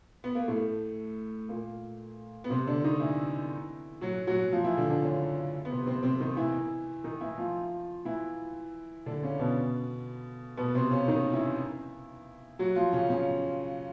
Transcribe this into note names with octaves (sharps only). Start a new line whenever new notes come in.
B3
A#3
A2 A3
A#2 A#3
B3
C3 C4
D3 D4
D#3 D#4
E3 E4
F#3 F#4
F#3 F#4
F3 F4
E3 E4
D3 D4
D3 D4
C#3 C#4
B3
C3 C4
C3 C4
C3 C4
D#3 D#4
E3 E4
D#3 D#4
E3 E4
F3 F4
E3 E4
D3 D4
C#3 C#4
B2 B3
B2 B3
C3 C4
C#3 C#4
D#3 D#4
E3 E4
F#3 F#4
F3 F4
C#3 C#4
C#3 C#4